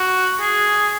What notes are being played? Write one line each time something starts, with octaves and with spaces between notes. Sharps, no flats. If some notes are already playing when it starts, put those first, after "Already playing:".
Already playing: F#4
G#4